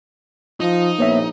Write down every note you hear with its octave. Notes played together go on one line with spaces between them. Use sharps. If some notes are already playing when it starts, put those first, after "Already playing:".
F3 D#4 F4
A#1 A#3 B3 C#5 E5